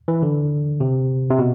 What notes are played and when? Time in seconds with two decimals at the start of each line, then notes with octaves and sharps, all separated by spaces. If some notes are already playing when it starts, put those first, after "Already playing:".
0.08 E3
0.23 D3
0.80 C3
1.30 C3
1.39 B2